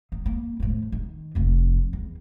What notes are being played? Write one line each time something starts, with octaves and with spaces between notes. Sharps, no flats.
D#3
A#3
A2 F3
D#3
F1 F3
E2